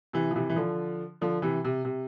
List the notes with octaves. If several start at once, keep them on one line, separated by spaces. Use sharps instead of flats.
C3 E3
F3
C3 E3
E3
D3 F3
D3 F3
C3 E3
C3
C3